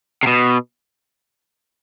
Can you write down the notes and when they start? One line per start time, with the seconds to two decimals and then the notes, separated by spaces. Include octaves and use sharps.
0.23 C3
0.27 B2